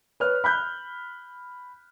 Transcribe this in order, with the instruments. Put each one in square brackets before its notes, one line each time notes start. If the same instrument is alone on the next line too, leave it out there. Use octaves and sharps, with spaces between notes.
[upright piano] B4 C#5 F6
B5 F#6 G6